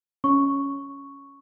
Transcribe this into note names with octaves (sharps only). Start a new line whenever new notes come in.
C#4 C#6